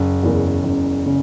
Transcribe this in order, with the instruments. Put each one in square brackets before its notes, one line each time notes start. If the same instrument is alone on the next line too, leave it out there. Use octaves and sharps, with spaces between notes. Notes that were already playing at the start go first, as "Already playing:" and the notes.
Already playing: [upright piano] F#1
E2 C#3 E3 A#3
F#1
C#3